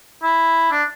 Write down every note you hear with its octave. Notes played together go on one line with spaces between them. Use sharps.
E4
D4